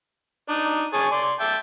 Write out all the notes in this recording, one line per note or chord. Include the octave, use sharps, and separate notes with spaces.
D4 D#4
G#4 C#5 A5
D5 C6
E5 G5 A5